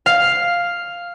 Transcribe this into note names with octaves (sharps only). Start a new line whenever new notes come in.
F5